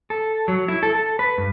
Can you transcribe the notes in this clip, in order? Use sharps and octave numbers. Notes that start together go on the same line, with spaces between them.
A4
F#3
E4
A4
A4
B4
G2